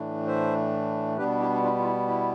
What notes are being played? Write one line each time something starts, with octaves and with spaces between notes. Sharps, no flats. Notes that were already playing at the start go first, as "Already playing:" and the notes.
Already playing: A2 E3 A3 D4
C5 E5
B2 G3 B3 D4 G4 B4
E4 G4
D4 F4
F4
E4
E4